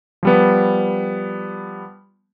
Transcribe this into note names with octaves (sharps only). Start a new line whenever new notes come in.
F3 G3 B3